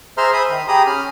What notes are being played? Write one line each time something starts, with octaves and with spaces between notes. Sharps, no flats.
G#4 C5 E5 A#5 C6 F6
E5 B5 D#6
D#3
G4 G#4 A#5 B5 D#6
C#4 F6